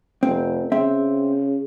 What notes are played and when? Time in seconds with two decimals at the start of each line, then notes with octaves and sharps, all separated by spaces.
0.23 F1 C4
0.72 C#3 C4 E5